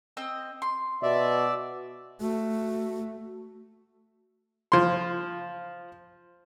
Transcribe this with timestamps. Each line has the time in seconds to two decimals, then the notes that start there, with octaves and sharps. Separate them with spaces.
0.17 C4 D#5 E6
0.62 C6
1.03 B2 D5 E5
2.21 A3 F#4
4.72 F3 C6